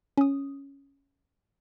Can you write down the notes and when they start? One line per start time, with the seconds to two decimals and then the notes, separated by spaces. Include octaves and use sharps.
0.17 C#4 D#6